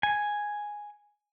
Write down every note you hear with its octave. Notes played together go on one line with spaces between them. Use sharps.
G#5